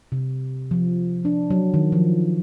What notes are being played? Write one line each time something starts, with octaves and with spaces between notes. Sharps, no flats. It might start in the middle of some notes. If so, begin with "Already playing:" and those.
C3
F3
D4
F#3
D#3
F3